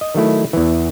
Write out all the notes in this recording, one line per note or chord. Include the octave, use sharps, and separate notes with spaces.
D#5
D#3 F#3 A3 E4
E2 E3